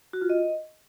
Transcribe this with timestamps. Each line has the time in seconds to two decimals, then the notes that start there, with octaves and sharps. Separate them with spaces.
0.13 F#4
0.21 F4
0.30 D#5